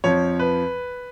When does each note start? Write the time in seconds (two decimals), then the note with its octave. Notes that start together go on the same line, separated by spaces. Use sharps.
0.04 F2 F3 C#5
0.39 B4